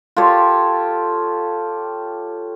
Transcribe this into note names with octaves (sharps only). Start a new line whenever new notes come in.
F4 G4 A4 C#5